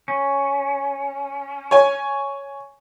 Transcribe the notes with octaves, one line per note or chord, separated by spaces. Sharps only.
C#4
C#5 G#5